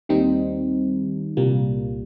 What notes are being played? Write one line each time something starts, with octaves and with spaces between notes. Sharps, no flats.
D#2 D#3 G3 C4 D#4
C2 A#2 G3 A#3